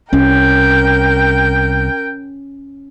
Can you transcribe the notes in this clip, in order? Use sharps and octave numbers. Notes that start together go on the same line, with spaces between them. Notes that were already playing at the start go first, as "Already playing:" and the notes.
C2 C#4 A#4 G5